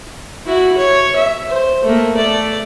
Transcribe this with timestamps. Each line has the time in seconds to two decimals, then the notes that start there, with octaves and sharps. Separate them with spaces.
0.46 E4 F#4
0.77 C#5
1.16 E5
1.49 C5
1.84 A3 A#3
2.16 A3 D5